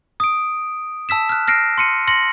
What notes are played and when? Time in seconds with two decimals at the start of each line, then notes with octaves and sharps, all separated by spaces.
0.20 D#6 D7
1.09 A5 E6 B6 E7
1.29 F6 F#6
1.48 F6 A#6 C7 D7
1.78 C6 C#7 D#7
2.07 C6 A#6 C#7 F#7